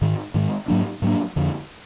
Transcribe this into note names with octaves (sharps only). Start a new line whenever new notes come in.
G#2 D#3 G#3
G#2 D#3 G#3
G#2 F#3 A#3 D4
G#2 F#3 A#3 D4
F2 D3 F3